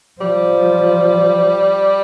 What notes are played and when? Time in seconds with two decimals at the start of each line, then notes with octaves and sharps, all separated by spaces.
0.21 F3 G3